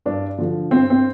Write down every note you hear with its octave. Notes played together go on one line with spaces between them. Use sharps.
G2 D4
D3 F3
G2 C4
C4